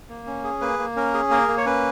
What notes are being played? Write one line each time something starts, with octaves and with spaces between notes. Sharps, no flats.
A#3
C#4
G#4
A#3 B4
A#3
C#4 A#4
G#4
A#3 A#4
A#3
C#5
C#4 B4